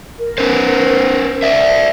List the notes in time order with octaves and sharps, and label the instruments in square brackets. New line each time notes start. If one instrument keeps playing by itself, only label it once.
[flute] A#4
[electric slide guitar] C#4 B4 C5
D5 E5